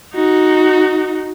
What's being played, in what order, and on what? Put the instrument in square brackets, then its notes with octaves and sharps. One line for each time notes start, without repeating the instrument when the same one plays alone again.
[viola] D#4 F#4